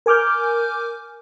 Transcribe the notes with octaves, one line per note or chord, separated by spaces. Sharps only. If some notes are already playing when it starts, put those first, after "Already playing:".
A#4 G#5 D6 F6 G6